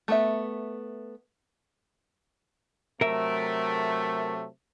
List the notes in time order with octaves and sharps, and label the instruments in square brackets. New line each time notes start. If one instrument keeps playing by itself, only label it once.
[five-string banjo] A3 B3 E5
[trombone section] C3 F#3 A3 [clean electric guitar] A#4 E5